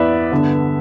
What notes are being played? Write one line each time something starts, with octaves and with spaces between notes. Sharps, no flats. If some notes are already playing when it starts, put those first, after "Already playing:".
Already playing: E2 E3 B3 B4 D5 E5
G2 D3 B3